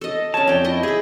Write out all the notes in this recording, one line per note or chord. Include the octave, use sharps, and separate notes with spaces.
A4 D#5
C#4 C#5 A5
F2 D5 G5
E4 D#5
G#4 B5